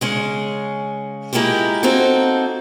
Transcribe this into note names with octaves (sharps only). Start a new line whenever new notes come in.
C#3 G#3 C#4
G#3 A#3 E4 F4 G4
A#3 C4 D#4 F#4 A4